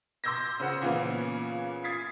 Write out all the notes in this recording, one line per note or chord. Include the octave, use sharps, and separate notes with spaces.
C6 D6 E6 G6 G#6 A#6
C#3 C5 F#5
A#2 C#3 E3 A#3 B3
D#6 G#6 A6 B6 C7